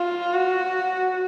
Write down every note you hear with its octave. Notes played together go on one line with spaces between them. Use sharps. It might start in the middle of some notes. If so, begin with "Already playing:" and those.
Already playing: F4
F#4